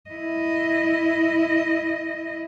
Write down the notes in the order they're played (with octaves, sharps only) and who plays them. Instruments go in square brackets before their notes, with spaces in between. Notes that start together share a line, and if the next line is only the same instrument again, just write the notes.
[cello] E4 D#5